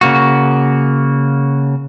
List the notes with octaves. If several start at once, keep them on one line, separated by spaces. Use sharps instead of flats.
C#3 A#3 F#4